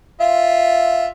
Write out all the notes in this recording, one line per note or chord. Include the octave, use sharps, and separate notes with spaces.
F4 E5